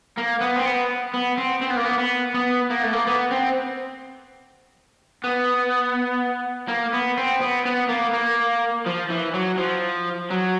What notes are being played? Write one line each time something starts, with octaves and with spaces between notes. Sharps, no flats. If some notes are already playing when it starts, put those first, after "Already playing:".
A#3
B3
C4
B3
B3
C4
C4
B3
A#3
B3
B3
B3
A#3
A3
A#3
B3
C4
B3
A#3
B3
C4
B3
B3
A#3
A#3
F3
E3
F#3
F3
F#3